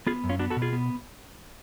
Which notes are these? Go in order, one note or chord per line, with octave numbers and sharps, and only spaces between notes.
B3 F4 G#4
F#2
C#4 F4
B3 D4 F#4
F#4 A4
B2
F4 G#4
B3